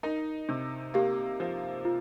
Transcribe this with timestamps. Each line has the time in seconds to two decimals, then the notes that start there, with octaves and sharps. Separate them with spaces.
0.03 D#4 A#4
0.49 C3
0.94 A#3 G4
1.40 F3
1.85 F4